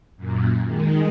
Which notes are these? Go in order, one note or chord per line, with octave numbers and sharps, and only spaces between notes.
F#2 A#2
D#3 G#3